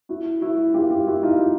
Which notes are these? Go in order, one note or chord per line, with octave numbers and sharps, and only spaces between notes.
E4 F#4
E4 F#4
F4 G4
F4 G4
E4 F#4
D#4 F4